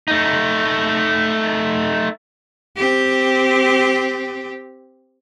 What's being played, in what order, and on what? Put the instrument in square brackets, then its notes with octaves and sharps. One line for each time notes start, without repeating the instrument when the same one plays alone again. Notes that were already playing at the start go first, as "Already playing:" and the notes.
[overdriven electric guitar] A3 D#4
[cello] C4 G4